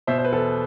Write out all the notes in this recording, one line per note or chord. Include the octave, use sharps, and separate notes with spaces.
B2 C5 E5
C5
B4
E2 A4